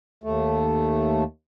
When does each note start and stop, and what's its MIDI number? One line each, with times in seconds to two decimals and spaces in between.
0.24 1.24 39
0.24 1.24 57